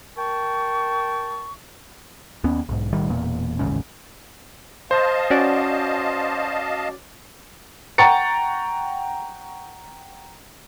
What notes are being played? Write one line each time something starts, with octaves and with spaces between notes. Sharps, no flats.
A#4 G5 A5 C#6
D#2 B3 C#4
B1 G#2
B1 A2 D#3 G3
E1 E2 A#2
A1 D#2 G#2 C#3
C5 D#5 F5 A5
C#4 F#4 D5
F#5 G5 A#5 C#6 A6 C#7